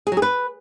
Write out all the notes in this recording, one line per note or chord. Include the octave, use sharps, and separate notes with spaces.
G#4
F#3
G#4
B4